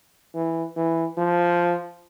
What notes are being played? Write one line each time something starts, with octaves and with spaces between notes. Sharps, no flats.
E3
E3
F3